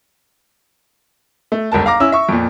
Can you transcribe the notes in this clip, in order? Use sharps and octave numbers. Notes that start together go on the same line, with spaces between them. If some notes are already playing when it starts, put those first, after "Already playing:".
A3
G1 C#2 A#4 A5
F5 A#5 D6 A#6
C#4 E4 E6
E5 C#6
F2 A#2